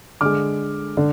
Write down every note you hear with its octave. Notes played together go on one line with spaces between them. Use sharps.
D3 G#3 D6 F6
D3